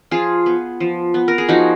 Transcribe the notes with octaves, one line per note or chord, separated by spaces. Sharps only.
F3 F4 G#4
B3
F3
B3
A#4
G#4
F3 D#4 F#4